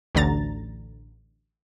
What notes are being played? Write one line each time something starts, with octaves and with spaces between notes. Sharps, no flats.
A1 D2 D3 A#5 A6